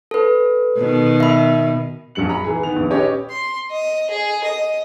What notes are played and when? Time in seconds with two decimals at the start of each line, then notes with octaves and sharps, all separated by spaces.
0.11 A4 B4
0.77 B2 D#3
1.20 E5 B5
2.15 A#1 F#2 F#3 C#7 F#7
2.29 A#5 B5
2.44 E3 G#4
2.63 D#3 B3 F7
2.76 A#1
2.91 C#4 G4 B4 C#5 D#5
3.30 C6
3.71 D#5
4.10 G#4
4.44 D#5